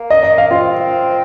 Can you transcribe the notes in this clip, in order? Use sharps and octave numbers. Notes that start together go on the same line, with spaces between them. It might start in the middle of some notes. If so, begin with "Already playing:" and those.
Already playing: A#3
D#5
D#5
F5
C4 F4